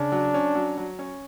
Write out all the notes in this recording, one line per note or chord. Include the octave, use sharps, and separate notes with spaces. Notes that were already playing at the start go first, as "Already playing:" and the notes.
Already playing: C#3 D4
F#3
C#4
F#3
F#3
C#4